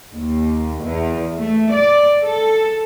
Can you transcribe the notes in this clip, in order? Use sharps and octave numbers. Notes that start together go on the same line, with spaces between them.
D#2
E2
A3
D5
A4